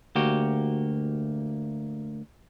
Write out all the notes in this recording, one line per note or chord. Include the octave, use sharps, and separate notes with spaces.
D2 A#3 F#4 G4